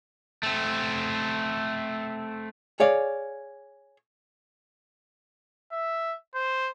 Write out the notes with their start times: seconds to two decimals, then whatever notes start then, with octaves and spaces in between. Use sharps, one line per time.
0.43 A3 C4
2.80 G#4 C#5 D5 F5
5.72 E5
6.35 C5